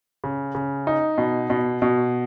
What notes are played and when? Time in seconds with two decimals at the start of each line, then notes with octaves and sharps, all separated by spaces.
0.24 C#3
0.55 C#3
0.87 D#4
1.18 B2
1.50 B2
1.82 B2